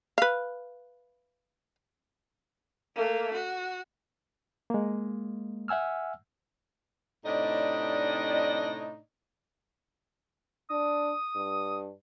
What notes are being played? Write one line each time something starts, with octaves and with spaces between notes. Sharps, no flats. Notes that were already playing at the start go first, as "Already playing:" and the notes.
B4 F5
A3 A#3
F#4
G#3 A#3
E5 F#5 G#5 E6 F6
A2 C3 D4 D#4 D5 D#5
D4 D#6
G2